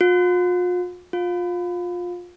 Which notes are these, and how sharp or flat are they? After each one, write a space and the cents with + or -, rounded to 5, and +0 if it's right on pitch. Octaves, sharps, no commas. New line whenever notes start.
F4 +40
F4 +20